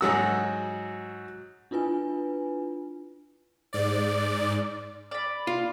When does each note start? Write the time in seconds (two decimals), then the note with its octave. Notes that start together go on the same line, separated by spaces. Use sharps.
0.01 G#2 F#3 F#4 E6
1.71 D4 E4 F4 B4 G#5
3.73 G#2 D5
5.11 D5 B5
5.47 F4